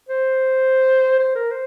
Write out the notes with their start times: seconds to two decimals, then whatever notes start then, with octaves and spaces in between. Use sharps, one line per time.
0.09 C5
1.19 C5
1.35 A#4
1.51 C5